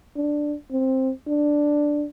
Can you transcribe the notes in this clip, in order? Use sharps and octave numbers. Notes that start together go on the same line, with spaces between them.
D4
C4
D4